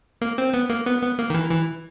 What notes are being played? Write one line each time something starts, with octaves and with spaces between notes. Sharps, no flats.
A#3
C4
B3
A#3
B3
B3
A#3
D#3
E3
E3